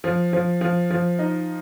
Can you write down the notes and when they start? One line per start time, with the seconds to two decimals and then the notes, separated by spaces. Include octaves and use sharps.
0.04 F3
0.33 F3
0.61 F3
0.90 F3
1.19 D#4